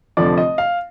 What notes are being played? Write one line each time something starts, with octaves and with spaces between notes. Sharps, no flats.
F1 F2 D3 F3 D5
D#5
F5